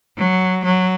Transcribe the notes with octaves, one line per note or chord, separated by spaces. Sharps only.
F#3
F#3